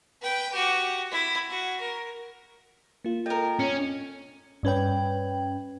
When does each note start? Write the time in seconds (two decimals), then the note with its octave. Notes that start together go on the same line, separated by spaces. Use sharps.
0.21 B4 G5
0.52 F#4 G4
1.11 E4
1.50 F#4
1.80 A#4
3.04 A#3 F4
3.26 A4 A#4 D#5 G5
3.59 C#4 C#7
4.63 G2 C#4 B4 G5